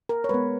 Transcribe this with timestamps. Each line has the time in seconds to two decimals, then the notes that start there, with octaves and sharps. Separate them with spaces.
0.09 A#4
0.24 C#5
0.29 G#3 B3 B4